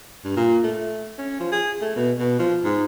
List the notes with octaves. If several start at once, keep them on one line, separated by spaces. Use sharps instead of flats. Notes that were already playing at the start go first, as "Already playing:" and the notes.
G2
A#2
A3
C#4
F3
G#4
A3
B2
B2
F3
G#2